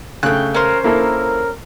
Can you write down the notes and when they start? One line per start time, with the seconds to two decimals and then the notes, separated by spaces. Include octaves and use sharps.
0.23 C#3 A3 G5 F#6
0.55 C#4 A#4 C5
0.84 A#3 E4 A4 A#4